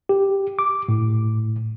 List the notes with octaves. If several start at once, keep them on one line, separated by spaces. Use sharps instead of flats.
G4
D6
A2